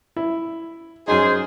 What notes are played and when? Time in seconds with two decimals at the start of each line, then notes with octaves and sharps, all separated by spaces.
0.17 E4
1.08 F#2 D#4 G#4 C5